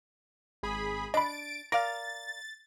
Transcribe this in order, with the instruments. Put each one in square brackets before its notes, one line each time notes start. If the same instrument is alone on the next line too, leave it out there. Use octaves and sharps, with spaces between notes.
[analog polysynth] G#1 G#4 B5
[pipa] D4 [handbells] D#5 B5 [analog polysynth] A6 D7
[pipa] A#4 D5 F5 [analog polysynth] A6 [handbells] A#6